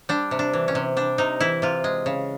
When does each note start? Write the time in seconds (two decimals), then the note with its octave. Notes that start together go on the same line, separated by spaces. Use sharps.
0.09 G3 D4
0.31 C3
0.39 D4
0.53 E3
0.68 C#4
0.75 C3
0.97 G3 D4
1.18 C3 D#4
1.40 E3 E4
1.62 C3 F4
1.84 G#3
2.06 C#3